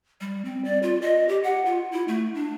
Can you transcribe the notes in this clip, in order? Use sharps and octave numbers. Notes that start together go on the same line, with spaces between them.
G3
C4
D5
F4
D#5
G4
F#5
F4
E4
A3
D4